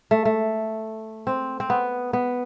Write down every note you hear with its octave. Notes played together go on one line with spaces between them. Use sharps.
A3
A3
C4
C4
B3
B3